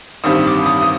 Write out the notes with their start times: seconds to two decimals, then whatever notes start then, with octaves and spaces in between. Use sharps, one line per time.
0.24 A1 G2 D#3 G3 C4 D#6
0.46 D6
0.66 D#6
0.82 D#6